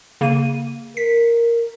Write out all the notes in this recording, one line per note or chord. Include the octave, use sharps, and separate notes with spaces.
C#3 A#3 D#7
A#4 B6